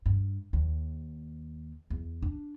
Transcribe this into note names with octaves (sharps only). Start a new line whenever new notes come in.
G2
D#2
E2
D4